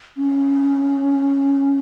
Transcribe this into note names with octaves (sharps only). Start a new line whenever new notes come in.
C#4